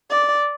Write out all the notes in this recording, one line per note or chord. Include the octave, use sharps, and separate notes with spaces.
D5